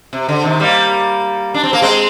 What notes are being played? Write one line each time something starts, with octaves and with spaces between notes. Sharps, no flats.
C3
D3
C3 D#3
G3 A#3
D4
C4
A#3
G#3 C4